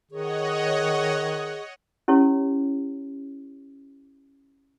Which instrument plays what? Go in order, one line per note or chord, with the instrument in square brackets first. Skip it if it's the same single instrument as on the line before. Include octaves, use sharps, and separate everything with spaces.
[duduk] D#3 [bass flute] G#4 [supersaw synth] C#5 D#5 F#5
[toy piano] C#4 E4 G4 C#5